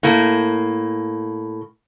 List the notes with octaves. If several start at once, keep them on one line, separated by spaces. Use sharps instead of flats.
A2 A#3